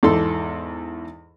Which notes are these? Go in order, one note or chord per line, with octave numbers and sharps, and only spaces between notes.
E2 G#2 A4 C6